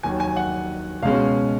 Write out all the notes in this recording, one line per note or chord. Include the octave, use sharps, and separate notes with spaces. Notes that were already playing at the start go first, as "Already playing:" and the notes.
D#2 D#3 F#3 G#5
G#5
F#5
C#2 B2 G#3 C#4 F5